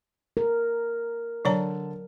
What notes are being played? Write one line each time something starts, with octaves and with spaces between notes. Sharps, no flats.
A#4
D3 F#3 C#5 A5 A#5